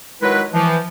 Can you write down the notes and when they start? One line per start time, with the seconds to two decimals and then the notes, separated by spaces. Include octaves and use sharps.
0.22 D#3 F#3 G#3 E4 B4
0.54 E3 F3